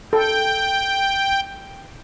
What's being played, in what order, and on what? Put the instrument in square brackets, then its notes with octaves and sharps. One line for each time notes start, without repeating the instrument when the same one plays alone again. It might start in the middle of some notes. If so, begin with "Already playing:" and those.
[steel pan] A4 [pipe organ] G5